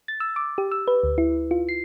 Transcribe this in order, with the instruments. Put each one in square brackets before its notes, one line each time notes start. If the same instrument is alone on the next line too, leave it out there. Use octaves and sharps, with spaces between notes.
[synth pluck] A6
E6
D6
G4
E6
B4
D2
E4
F4
C7